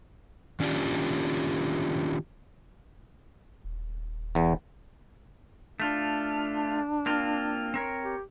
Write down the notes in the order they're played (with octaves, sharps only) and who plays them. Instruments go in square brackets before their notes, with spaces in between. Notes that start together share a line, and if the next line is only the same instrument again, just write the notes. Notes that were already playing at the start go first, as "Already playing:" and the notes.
[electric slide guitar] D#3 C#4 D4 F4 G4
[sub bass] D#1
[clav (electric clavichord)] E2
[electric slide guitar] A3 F4 [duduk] D4
[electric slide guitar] A#3 C4 F4
C4 A#4 C#5
[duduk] G4